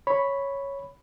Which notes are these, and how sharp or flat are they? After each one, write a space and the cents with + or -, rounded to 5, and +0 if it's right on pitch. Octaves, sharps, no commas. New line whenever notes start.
C#5 +0 B5 +0